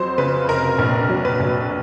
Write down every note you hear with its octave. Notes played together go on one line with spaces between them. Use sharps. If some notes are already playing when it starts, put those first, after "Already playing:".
Already playing: F2 F#3 C5
C#3 B4
F1 A#4
A#1 A#4
F#3
B4
A#1